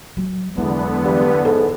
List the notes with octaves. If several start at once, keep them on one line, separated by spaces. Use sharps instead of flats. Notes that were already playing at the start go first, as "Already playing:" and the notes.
F#3
E2 D3 F#3 G#3 B3
G2
G#2 A4